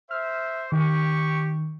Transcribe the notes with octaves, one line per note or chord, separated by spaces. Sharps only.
C5 E5 F6
D#3 G4 C#6